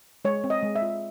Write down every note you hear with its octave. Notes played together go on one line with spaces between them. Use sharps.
G#3 C#5
C4
D#5
G#3
E5
F4